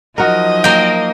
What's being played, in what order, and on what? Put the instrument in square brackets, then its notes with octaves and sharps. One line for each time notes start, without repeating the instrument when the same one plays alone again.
[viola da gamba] F3 F#3 D#4 [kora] F#4 A#4 [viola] D#5
[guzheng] A#3 G5